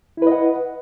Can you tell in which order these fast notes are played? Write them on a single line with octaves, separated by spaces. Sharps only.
E4 B4 D#5 F#5